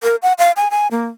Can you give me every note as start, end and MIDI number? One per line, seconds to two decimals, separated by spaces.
0.03 0.16 70
0.23 0.33 78
0.38 0.52 77
0.57 0.68 80
0.71 0.88 80
0.91 1.06 58